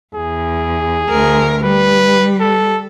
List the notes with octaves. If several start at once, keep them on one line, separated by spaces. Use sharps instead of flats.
E2 G#4
D2 A#4
G3 B4
A4